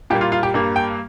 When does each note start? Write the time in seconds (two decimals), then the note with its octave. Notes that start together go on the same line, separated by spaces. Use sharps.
0.10 A#2 G3 A#3 G4
0.21 F4
0.32 F4
0.43 G4
0.54 G2 G3 A#3
0.76 G5